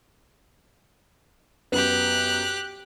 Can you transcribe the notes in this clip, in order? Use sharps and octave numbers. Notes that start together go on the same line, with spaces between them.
F#2 B3 G4 B4 F#6